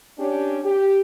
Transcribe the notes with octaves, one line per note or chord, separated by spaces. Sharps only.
C#4 D4 G4
G4